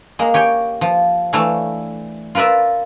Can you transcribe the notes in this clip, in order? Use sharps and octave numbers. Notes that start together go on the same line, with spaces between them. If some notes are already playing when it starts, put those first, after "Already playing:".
G#3 A#3
G4 C#5 G5 G#5
F3
E3 A3 D4 C#5 F5
F4 A#4 B4 D5 E5